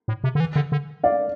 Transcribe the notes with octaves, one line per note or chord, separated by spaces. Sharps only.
A2
C3
D3
E3
D3
D3
D5 F5